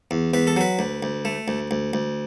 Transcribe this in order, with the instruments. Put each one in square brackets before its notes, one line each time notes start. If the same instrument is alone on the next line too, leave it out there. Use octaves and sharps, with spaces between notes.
[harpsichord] E2
E2 B4
A4
F#3 B4
D2
D2
A3
D2
D2
D2